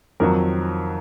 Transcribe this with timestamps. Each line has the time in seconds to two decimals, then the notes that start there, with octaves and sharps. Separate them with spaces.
0.20 F2 D#3 F#3 A#4